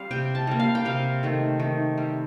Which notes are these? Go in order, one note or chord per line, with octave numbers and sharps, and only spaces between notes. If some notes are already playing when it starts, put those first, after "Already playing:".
Already playing: G3 C4 F5
C3 G5
A5
G3 A#3
F5
G5
C3 F5
D#3 A3
D#3
G3 C4